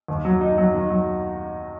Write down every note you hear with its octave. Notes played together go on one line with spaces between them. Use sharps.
D#2
F#3
D#4
F#3
D#3
F#3